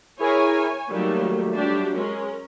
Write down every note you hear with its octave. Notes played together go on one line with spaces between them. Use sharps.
E4 G#4 A#4 C#5 G#5
D#3 F#3 G3 A3 A#3
F#3 D4 G4
G#3 C#4 A#4